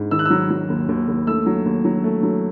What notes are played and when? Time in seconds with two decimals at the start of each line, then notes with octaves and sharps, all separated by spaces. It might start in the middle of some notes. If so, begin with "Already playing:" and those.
Already playing: G#2
0.11 D#3 E6
0.19 F#6
0.25 F#3 E6
0.50 F#3
0.70 D#2
0.89 D#2
1.08 D#2
1.27 A3 E6
1.46 F#3
1.66 D#2
1.85 F#3
2.04 A3
2.23 F#3